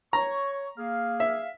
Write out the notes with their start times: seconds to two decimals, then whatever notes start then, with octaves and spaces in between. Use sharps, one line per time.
0.13 C#5 A#5 C#6
0.78 A#3 G#4 F5
1.20 E5